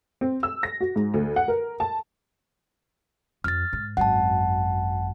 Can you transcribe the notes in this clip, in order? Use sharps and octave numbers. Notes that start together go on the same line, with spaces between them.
C4
E6
A#6
F#4
G#2
D2
F#5
A#4
A5
F2 F6 A6
G#2
G#1 F#2 F#5 A5